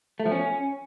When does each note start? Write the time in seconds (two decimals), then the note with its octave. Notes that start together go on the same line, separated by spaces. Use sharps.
0.20 A3
0.26 F3
0.32 C#4